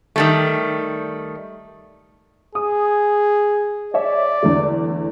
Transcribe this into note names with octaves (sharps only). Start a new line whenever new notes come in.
D#3 G3 A3
G#4 D#6
C#5 D5 E5
E2 D3 A3